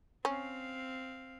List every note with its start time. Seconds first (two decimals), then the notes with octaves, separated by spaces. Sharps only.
0.25 C4 C#4 F5